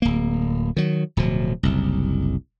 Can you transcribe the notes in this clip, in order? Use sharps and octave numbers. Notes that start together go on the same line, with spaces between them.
D1 A#3
D#3 F#3
D1 B2 F3
F#1 C2